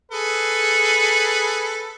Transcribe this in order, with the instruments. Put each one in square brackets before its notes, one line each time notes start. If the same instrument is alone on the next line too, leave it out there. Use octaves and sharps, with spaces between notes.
[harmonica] G#4 A4 B4